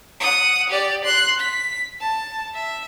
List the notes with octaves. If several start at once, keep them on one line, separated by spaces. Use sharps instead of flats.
F#5 D#6
G4 D5
C6 F#6
B6
A5
E5